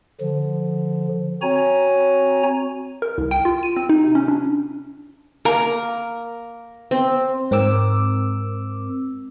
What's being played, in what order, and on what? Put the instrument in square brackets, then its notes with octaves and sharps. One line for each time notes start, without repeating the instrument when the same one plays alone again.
[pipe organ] D3 F3
C4 F#4 C#5 G#5 A#5
[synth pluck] A#4
C2
G5
F4
D#7
C4
D#4
C3
C#4
D4
[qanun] A#3 [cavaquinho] A#4
[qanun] C4
[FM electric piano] G#2 C4 A#4 D6 E6